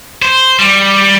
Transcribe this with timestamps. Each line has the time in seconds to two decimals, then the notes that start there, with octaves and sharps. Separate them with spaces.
0.22 C5
0.59 G3